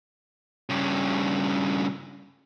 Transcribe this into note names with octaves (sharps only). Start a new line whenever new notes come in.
G2 C#3